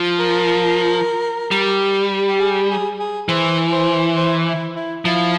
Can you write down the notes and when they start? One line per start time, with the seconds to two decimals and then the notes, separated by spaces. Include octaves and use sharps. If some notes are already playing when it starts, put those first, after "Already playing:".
Already playing: F3
0.19 A#4
1.51 G3
2.28 G4
2.40 G#4
2.70 G#4
2.99 G#4
3.29 E3 C5
3.72 C5
4.17 C5
4.46 E4
4.75 E4
5.05 F3 E4